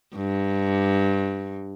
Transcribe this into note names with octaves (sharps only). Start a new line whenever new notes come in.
G2